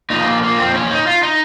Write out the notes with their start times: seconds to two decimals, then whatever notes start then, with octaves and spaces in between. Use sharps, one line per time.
0.10 A#2 F3 D#4
0.26 A#3
0.43 A#3
0.58 C4
0.74 C#4
0.91 D#4
1.07 F4
1.23 D#4